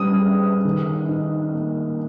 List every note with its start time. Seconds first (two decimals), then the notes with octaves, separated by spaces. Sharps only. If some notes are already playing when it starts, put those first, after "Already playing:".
Already playing: G3 C#4 D#6
0.20 G#4
0.65 D#3
1.09 D#4
1.53 A#3